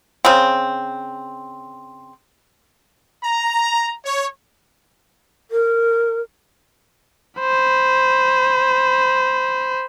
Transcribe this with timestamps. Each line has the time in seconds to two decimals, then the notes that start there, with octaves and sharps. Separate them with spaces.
0.25 C#3 C4
3.24 A#5
4.05 C#5
5.51 A#4
7.40 C5 B5